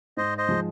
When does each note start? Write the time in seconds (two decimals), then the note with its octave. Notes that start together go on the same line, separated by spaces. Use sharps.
0.17 G#2 C5 D#5
0.38 C5 D#5
0.49 F3 G#3